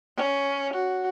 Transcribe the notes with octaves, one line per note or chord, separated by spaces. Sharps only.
C#4
F#4